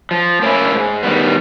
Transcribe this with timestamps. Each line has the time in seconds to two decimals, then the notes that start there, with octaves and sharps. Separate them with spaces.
0.11 F3
0.42 A#3 C#4 E4
0.72 G#2
1.03 D#3 G3 B3